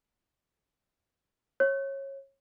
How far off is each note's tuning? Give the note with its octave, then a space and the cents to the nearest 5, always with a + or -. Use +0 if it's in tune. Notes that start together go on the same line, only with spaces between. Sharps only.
C#5 -25